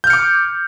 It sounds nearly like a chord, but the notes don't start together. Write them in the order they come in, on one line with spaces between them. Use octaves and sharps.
G6 F6 C#7 D6